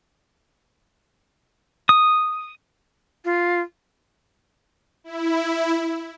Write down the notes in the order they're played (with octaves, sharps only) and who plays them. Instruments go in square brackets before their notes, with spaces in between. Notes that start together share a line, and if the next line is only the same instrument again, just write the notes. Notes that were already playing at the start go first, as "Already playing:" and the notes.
[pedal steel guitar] D#6
[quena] F4
[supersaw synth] E4